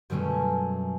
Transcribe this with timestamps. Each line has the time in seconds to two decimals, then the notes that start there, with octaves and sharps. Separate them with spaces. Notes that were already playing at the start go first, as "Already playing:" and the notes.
0.10 F#2 B2 D3 G3 A3 C#4